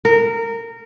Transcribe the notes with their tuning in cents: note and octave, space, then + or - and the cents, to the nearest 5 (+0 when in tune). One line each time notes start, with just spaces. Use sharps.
A#4 -20